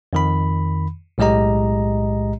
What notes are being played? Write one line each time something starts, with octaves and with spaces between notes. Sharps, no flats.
F2 D#3 B5
B1 A2 G#3 G4 D#5 A#5